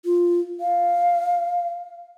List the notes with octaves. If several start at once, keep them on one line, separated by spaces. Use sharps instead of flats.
F4
F5